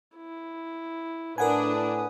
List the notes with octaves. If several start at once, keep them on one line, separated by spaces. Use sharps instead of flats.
E4
A2 D4 A#4 B4 F#5 G#5 D#6